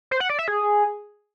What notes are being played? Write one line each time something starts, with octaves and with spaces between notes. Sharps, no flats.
C5
F#5
D5
E5
G#4